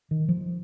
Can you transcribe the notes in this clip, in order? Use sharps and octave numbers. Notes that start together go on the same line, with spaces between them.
D#3
F3